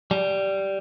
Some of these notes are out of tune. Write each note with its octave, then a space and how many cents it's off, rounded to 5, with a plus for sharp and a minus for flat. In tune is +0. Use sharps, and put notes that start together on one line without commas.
G3 -10